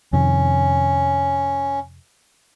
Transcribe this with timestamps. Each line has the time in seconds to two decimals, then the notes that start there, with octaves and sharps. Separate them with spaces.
0.13 F2 C3 D#3 C#4